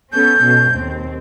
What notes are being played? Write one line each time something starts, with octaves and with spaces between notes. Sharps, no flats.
B3 C#4 A4 G6
B2
D#2 C4